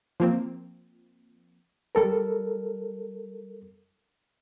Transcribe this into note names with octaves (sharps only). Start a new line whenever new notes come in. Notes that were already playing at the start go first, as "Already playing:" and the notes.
F3 A#3 C4
G3 A4 A#4